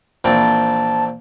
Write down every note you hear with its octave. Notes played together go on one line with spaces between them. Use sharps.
A#1 E3 C4 A5